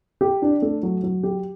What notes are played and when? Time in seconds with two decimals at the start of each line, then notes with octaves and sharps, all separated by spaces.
0.21 G4
0.42 D4
0.62 A3
0.83 F#3
1.03 F#3
1.23 G4